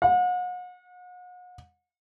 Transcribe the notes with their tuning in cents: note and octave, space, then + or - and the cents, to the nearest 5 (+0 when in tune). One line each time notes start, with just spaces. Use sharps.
F#5 -40